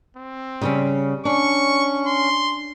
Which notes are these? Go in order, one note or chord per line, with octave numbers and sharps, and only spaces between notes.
C4
C#3 G3 C#4
C#4 D4 C#6
C6